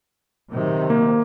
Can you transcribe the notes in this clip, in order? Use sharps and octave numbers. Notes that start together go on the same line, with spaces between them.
C3 D#3 F#3
A#3